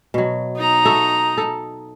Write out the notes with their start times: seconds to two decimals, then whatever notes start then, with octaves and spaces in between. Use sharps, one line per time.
0.14 B2 F#3
0.56 D#4 A#5
0.86 F#4 A4 E5
1.38 A4